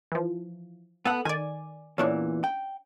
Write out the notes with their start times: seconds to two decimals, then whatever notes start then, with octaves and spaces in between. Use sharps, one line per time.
0.12 E3 F3
1.05 B3 A4 F#5
1.25 D#3 D5 G#5
1.98 E2 A#2 E3 C#4 D4
2.44 G5